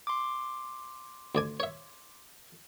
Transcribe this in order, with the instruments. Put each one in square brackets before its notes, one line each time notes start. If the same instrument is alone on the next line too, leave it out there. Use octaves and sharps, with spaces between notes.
[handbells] C6 D6
[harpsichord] D2 D5 G#5
C#5 E5